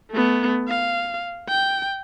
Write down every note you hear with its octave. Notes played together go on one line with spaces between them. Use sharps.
A3 B3
F5
G5